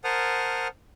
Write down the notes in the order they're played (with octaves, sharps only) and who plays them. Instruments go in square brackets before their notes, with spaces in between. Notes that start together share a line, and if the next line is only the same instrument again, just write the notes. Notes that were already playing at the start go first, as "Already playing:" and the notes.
[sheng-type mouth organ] A#4 C5 F#5 A5 D#6 F6